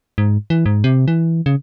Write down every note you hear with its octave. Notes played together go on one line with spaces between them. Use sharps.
G#2
E3
G#2
C3
E3
C#3